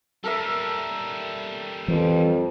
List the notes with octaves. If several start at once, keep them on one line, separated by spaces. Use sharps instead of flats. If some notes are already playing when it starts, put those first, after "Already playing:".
G3 C#4 A4 A#4 E5
F2 E3